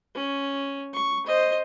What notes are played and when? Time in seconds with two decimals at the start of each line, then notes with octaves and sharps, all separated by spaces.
0.15 C#4
0.93 C#6
1.26 C5 D#5